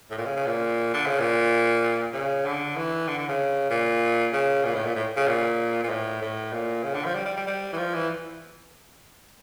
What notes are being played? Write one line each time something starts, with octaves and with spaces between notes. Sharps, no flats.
A2
A#2
C#3
C#3
A#2
D3
C#3
A#2
C#3
D3
E3
D3
D3
C#3
A#2
C#3
A#2
A2
A#2
A2
C#3
A#2
A#2
A2
A2
A#2
C#3
D3
F3
G3
G3
G3
G3
E3
F3
E3